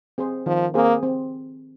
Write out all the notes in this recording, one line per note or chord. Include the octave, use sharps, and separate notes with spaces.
C4 G#4 C5
D#3 F3
A#3 C4 G#4 C5
C4